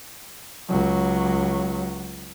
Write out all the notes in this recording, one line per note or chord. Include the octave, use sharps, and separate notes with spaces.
C#2 F#3